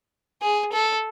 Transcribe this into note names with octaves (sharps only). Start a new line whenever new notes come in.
G#4
A4